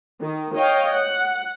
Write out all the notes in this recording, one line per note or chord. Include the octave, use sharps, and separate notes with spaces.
D#3
C#5 D#5 F5 G5
F#5